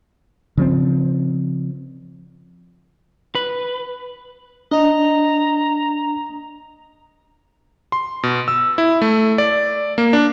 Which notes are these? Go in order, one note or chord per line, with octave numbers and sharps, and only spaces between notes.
C#3 F3 C4
B4
D4 D#5 A#5
C6
B2
E6
E4
A3
D5
A#3
D4